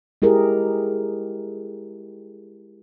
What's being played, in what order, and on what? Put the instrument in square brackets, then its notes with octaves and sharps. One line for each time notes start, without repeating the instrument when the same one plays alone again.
[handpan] G#3 E4 G4 G#4 A#4